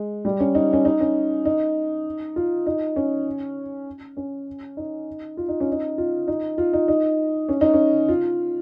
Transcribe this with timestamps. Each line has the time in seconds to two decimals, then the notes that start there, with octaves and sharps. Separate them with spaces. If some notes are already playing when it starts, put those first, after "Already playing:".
Already playing: G#3
0.25 G3
0.40 C#4
0.55 D#4
0.73 C#4
0.85 D#4
1.00 C#4
1.45 D#4
2.36 F4
2.66 D#4
2.96 C#4
4.17 C#4
4.77 D#4
5.37 F4
5.49 D#4
5.60 C#4
5.72 D#4
5.98 F4
6.28 D#4
6.58 F4
6.73 D#4
6.88 D#4
7.49 C#4
7.61 D#4
7.73 C#4
8.09 F4